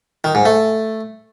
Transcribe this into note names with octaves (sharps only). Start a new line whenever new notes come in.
D#3
G#2
A3